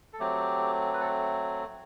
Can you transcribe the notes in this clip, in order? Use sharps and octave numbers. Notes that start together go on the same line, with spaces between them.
A4
F#3 A3 C4 G4
B4
A4